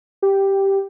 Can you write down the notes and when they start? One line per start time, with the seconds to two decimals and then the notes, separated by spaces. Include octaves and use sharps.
0.22 G4